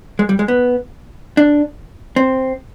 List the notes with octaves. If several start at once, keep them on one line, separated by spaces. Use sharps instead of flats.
G#3
G3
G#3
B3
D4
C4